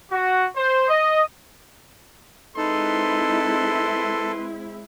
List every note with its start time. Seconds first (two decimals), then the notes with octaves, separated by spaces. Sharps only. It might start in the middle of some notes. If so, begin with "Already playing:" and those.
0.12 F#4
0.56 C5
0.89 D#5
2.57 G#3 C4 D#4 E4 A4 B4 C6